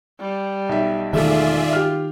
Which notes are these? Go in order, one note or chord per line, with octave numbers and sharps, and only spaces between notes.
G3
B1 E5
E1 D#3 A3 F4 G#4 D5 E5
G4 F6